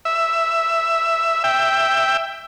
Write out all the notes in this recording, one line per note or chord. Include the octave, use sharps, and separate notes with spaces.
E5
E5 G5